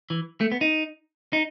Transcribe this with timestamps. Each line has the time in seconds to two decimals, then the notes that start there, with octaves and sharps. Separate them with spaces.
0.10 E3
0.41 A3
0.52 B3
0.61 D#4
1.33 D#4